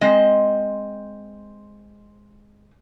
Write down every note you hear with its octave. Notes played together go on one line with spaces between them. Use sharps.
G#3 C4 D#5